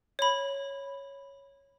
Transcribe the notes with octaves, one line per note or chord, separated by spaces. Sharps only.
C#5 B5